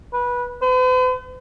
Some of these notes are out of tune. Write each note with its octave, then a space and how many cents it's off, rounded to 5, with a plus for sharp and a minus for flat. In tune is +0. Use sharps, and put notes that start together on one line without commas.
B4 -20
B4 +45